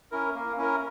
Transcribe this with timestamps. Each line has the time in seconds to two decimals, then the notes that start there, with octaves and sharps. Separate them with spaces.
0.11 C#4 E4 A#4
0.34 A#3
0.57 C#4 E4 A#4